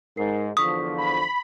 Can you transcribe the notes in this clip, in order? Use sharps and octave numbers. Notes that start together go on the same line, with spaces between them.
G#2 A#4 C7
E2 D3 F3 C#6 D#6 B6
B5